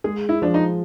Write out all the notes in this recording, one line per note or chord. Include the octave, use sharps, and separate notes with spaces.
G#3 G#4
E4
F3 D4
D#4